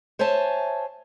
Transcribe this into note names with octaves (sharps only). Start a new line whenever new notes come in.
C5 C#5 E5 G#5 A5